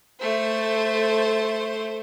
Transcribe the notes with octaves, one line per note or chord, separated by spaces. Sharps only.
A3 C5